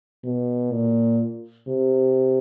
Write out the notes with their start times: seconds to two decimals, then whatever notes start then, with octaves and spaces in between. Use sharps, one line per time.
0.24 B2
0.72 A#2
1.68 C3